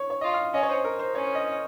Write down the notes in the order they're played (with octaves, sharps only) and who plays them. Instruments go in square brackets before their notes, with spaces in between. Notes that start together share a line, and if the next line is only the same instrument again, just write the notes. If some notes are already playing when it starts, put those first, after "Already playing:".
Already playing: [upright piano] C#5
C#5
[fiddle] F4 [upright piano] D#5
[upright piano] F5
[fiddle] C#4 [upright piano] D#5
[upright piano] C#5
C5
A#4
C5
[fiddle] C#4 [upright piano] C#5
[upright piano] D#5